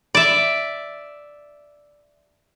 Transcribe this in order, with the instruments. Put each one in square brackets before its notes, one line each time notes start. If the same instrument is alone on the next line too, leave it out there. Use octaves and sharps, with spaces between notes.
[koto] D5 E5